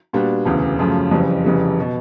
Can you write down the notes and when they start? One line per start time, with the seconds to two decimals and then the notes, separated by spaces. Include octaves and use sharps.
0.13 A#2 G3 B3 D4 F#4
0.45 E1 D2 C#3 E3
0.79 F#2 C#3 F3 A3
1.11 F#1 F2 C#3 E3 G3
1.44 F1 F2 C#3 E3 G3
1.80 B2